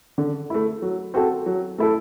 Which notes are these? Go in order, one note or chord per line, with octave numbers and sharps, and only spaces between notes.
D3
A3 E4
F#3
C4 F#4 A4
F#3
A3 E4 A4